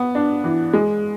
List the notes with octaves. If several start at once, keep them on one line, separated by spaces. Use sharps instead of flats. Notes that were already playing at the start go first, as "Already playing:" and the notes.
Already playing: B3
D4
E3
G#3